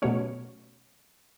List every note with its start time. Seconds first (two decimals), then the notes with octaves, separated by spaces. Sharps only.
0.02 B2 F#3 A3 C#4 C#5